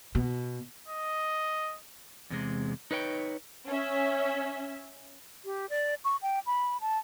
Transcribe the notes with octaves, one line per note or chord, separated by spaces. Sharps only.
B2
D#5
E2 C3 G#3
D#4 B4 C#5 G5
C#4 E5
G4
D5
C#6
G5
B5
A5